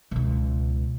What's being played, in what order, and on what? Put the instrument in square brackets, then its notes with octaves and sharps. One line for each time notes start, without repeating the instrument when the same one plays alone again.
[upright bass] C#2 B2